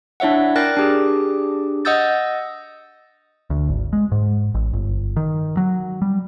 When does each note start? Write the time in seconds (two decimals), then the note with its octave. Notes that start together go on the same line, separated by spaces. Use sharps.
0.20 D4 E4 C#5 E5 F#5
0.56 A#4 D5 G5 F#6 A6 A#6
0.77 D4 G4 G#4
1.85 D#5 F#5 D#6 E6 G6 A6
3.50 D2
3.69 G#1
3.93 G#3
4.12 G#2
4.54 A1
4.73 G1
5.16 D#3
5.57 F#3
6.02 G3